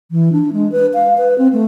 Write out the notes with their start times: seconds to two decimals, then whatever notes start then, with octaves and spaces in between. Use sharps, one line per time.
0.11 E3
0.32 D4
0.53 G#3
0.72 B4
0.94 F5
1.18 B4
1.38 C4
1.53 A3